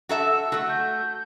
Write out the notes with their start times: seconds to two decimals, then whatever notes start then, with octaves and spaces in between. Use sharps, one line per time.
0.09 F#4 A4 E5
0.26 E6
0.52 A3 F#4
0.69 G6